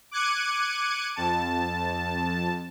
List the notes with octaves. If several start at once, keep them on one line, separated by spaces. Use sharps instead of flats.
D6 F#6 G#6 C#7 D#7
F2 A5